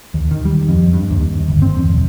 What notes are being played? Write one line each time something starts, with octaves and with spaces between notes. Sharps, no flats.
D#2
D#3
G3
F2
G2
D#2
G1
C4
E2
B1